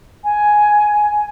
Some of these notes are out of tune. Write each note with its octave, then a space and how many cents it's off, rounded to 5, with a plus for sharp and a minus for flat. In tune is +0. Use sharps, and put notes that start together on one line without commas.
G#5 +10